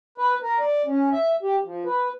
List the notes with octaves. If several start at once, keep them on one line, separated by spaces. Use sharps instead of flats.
B4
A#4
D5
C#4
E5
G4
F3
B4